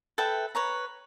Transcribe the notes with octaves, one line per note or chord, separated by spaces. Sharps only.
A4 B4 E5 G5
B4 C#5 A#5